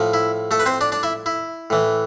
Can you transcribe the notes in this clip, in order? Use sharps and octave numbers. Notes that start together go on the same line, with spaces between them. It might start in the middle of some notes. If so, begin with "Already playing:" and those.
Already playing: A2 F3
E4
A3 A4
B4
C4 C5
D4 D5
D4 D5
E4 E5
E4
A2 E3